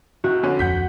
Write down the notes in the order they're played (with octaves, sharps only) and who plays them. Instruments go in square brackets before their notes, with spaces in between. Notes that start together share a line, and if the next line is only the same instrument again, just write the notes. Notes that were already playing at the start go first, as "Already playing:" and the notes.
[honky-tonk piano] C#2 [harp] F#4
[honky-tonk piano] F2 D3 C#4
[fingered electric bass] D1 F2 F3 [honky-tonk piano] F#5 G6 B6